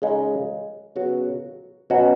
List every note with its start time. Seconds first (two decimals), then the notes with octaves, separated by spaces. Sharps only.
0.02 C#3 G#3 D#4
0.96 C#3 F#3 B3 F#4
1.90 B2 F#3 C#4 F#4